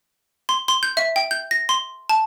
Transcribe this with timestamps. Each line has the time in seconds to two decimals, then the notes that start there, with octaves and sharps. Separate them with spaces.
0.49 C6
0.68 C6
0.83 G6
0.97 E5
1.16 G5
1.31 G6
1.51 A#6
1.69 C6
2.09 A5